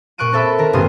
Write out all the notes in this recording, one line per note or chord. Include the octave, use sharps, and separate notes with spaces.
A#2 C#6 F#6 D7 D#7
C4 A4 E5 B5
D#3 A#4
A1 G2 C#3 B3 C6 D#6